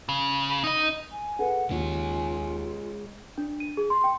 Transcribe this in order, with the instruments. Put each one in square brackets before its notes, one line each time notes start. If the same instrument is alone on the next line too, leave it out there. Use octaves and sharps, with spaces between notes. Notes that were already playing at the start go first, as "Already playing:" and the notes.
[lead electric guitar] C#3
D#4 D#5
[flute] G#5
[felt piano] G#4 A4 B4 [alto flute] F#5
[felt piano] D#2 [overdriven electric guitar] G#3 C#5 [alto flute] F4 [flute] G#5
[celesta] D4
D#7
G#4
C6
G5